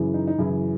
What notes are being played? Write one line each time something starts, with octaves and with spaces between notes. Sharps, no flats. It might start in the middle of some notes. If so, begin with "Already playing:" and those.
Already playing: F#2 C#3 E3
D#4
D#4
F#2 C#3 E3 E4